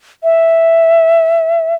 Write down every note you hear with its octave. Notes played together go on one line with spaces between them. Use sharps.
E5